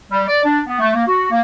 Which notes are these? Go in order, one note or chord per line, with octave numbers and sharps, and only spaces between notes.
G3
D5
D4
B3
A3
A#3
F#4
A#3